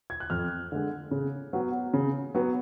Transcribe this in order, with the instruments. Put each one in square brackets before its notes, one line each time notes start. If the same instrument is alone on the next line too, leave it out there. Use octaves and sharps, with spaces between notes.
[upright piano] G#6
F#6
F2 F6
D3 G#3
C#3
F#3 B3
C#3
F#3 B3